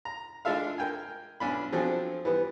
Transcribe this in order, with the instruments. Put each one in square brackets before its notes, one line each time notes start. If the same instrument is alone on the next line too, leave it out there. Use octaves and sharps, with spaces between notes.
[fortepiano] A#5
G#3 D4 F4 A4 E5 F5
A#4 G5 G#5
B1 C#4 D4 B5
F3 F#3 C4 D4 G#4 A4
E3 G3 B3